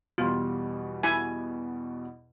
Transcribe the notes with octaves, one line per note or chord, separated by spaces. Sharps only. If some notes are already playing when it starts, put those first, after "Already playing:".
E2 B2 G3 F4
E4 G#5